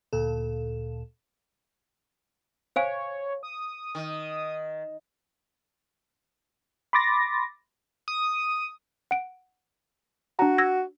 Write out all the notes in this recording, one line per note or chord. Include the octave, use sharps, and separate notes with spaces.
D2 A#2 A4
C5 C#5 F5 G#5
D#6
D#3
B5 C6 D6 A6 A#6
D#6
F#5 D7
D4 F#4 A#5
E6 G#6 A#6